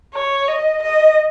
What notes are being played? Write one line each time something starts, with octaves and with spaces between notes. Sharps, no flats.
C#5
D#5
D#5